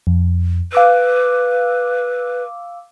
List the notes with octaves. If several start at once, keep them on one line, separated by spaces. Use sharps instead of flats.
F2
B4 F5 D6 E6